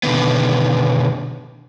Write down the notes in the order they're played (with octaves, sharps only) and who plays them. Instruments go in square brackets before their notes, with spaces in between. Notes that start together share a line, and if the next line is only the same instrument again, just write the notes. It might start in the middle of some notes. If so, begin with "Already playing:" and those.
[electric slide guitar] B2 D3 D#3 B3